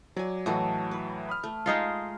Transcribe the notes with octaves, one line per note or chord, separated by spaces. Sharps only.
F#3 D5 G#5
A2 E3 F#3 F#4 A4 D#5
B4
B5 D#6 F6
A3
G#3 D#4 F4